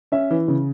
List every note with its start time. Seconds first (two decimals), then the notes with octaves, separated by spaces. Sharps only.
0.12 C#4 E5
0.31 E3
0.48 C#3